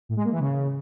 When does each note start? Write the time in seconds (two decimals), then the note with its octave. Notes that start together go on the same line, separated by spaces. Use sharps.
0.09 A2
0.17 G#3
0.24 A#3
0.32 E3
0.39 C#3